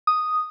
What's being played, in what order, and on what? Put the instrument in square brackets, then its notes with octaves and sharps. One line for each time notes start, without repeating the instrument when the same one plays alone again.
[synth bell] D#6